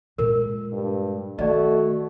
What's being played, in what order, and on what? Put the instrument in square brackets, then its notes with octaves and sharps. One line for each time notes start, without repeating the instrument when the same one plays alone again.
[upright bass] A#2 G#3 [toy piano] A#4
[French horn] G2
[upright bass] D#3 [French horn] A3 [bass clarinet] F#4 [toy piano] D5 D#5